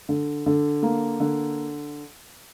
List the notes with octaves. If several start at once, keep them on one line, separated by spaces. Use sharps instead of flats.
D3
D3
A#3
D3